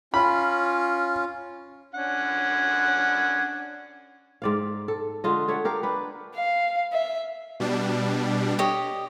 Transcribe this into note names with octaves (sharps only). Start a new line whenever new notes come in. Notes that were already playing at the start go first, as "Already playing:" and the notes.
C#4 F4 B5
C#4 D4 F#5
G#2 D5 F5
A4
D3 G#3 F4 D#5
A4 C#5 E5 F#5
D4 G4 A#4 F5
D4 B4
F5
E5
B2 G3 D4
G4 C#5 D#5